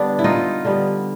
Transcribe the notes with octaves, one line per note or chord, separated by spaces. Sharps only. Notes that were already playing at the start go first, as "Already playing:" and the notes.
Already playing: D3 G3 B3 D4
E4
D#4 F4
D3 G3 B3